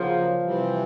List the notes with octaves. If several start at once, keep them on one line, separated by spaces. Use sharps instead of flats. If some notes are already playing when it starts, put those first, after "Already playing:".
Already playing: C#3 F3 F#3 A#3
C3 E3 G3 C4